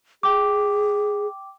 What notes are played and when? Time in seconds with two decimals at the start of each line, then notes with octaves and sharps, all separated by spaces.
0.23 G#4 G5 D6